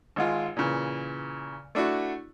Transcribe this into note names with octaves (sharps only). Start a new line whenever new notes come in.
G#1 G#3 F4
A#2 C#3 E3
A3 D4 E4 F#4